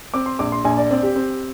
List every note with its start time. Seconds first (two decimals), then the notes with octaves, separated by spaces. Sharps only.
0.14 C4 D6
0.26 C6
0.39 A#1 D6
0.52 C6
0.65 A#1 G#5
0.77 D5
0.91 C4 D5
1.03 G4
1.16 C4